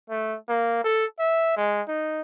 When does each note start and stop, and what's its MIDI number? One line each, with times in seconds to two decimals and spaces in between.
0.10 0.37 57
0.49 0.82 58
0.84 1.06 69
1.19 1.57 76
1.57 1.82 56
1.88 2.22 63